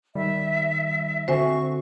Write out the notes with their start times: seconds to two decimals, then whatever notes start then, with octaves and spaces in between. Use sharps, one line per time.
0.15 D#3 G3 E5
1.28 D3 C4 F#4 C5 E5 G#5 C#6